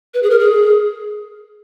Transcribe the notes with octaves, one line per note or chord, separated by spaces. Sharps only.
B4
G#4
A#4
G#4